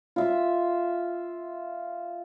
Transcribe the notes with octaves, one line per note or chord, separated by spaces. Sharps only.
F4 E5